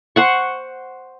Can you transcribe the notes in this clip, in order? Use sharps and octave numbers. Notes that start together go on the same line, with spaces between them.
C5 F#5 C#6